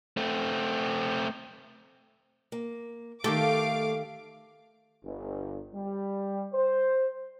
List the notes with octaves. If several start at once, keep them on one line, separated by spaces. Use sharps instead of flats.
A3 C4
A#3
D#3 A3 G4 A4 F5 D6
G1
G3
C5